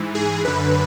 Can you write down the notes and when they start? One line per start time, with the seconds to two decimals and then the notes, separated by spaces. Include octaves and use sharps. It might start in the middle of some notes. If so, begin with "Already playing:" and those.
Already playing: G#2 E3
0.15 G#4
0.44 F#2 D3 B4